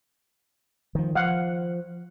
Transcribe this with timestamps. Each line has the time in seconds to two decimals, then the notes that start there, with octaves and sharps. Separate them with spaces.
0.95 D#3 F3
1.15 F3 F5 F#5